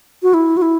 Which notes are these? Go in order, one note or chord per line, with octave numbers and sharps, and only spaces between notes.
F#4
E4
F#4
E4